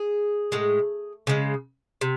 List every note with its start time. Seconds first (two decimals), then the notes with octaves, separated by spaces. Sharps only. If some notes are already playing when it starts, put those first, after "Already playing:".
Already playing: G#4
0.52 A2 G#3
1.27 C#3 G#3
2.01 C3